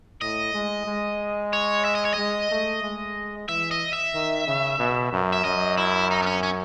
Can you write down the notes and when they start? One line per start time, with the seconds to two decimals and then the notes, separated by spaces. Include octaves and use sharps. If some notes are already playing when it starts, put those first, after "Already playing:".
0.21 A2 D#5
0.54 G#3
0.87 G#3
1.53 C#5
1.85 E5
1.95 D#5
2.05 C#5
2.14 G#3 D#5
2.51 A3
2.83 G#3
3.49 E3 E5
3.71 D#5
3.93 E5
4.14 D#3
4.47 C#3
4.79 B2
5.12 F#2
5.33 E5
5.45 F#2 D#5
5.78 E4
6.11 D#4
6.22 B3
6.26 C#4
6.43 C#4